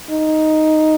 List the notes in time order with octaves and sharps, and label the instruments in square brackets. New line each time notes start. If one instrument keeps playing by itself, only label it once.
[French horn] D#4